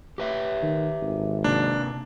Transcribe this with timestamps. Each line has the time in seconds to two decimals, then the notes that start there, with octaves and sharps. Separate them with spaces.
0.18 G4 B4 E5
0.62 D#3
1.02 G#1
1.44 C3 A#3 D4